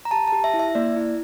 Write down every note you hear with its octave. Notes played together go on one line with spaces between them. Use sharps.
A#5
G4 A5
A5
G4
E5
E4
E5
A#3 D5
E4